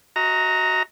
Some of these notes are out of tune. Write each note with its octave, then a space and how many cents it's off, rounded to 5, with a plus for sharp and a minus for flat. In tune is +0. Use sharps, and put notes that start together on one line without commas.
F#4 +0 D#5 +35 A#5 -10